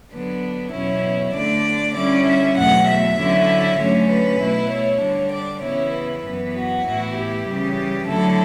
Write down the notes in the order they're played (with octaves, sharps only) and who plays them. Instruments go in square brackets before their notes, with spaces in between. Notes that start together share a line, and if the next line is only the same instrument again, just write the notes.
[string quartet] D3 F#3 B3 D4 B4
E2 B2 F#3 C#4 E4 C#5
D3 A3 D4 D5
D3 G3 C#4 E4 D5
E5
E2 B2 F#3 A3 F#5
E5
D3 F#3 C#4 E4
D3 F#3 A3 C#4 C#5
B4
B2 A3 E4
C#5
D3 G3 D4
D5
C#3 E3 B3 E4 C#5
B4
F#2 E3 B3
F#4
A2 E3 B3 E4
G4
C#3 E3 G3
D3 F#3 A3 E4 A4